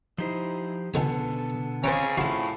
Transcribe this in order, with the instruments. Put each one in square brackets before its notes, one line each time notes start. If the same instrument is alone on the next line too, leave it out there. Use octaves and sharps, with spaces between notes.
[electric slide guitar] F3 G4 C5 [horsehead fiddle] D#4 E4
[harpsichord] C#2 G#3 G#5 [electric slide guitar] B2 D3 B3 [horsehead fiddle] A4
[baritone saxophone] C#3 [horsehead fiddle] C4 G#4 [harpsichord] C#4 C5
[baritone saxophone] A2 [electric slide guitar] F4 F5 [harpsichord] F#4 A5